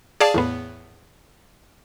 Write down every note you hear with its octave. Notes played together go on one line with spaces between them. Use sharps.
G#4 D5 F5 A5
E2 A2 B3